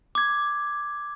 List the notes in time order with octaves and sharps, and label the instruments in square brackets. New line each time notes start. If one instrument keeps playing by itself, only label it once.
[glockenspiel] D6 G#6